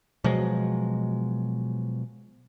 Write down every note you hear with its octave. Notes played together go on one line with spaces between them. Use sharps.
B2 F3 F#3 G#3